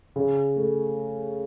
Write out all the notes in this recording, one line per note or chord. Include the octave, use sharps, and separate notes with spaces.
C#3
A3